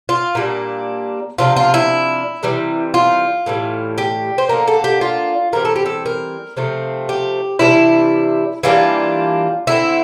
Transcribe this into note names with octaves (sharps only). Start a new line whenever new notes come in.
F4
A#2 G3 A#3 D4
C3 F3 A3 D4 F4
F4
E4
C3 E3 G3
F4
A2 E3 G3
G4
C5
D3 F3 A#3 D4 A#4
A4
G4
F4
E3 G3 C4 A#4
A4
G4
A4
A#4
C3 F3 A3 C4
G4
C3 E3 G3 D4 E4
E3 G3 A#3 D4 F4
D3 A3 C4 E4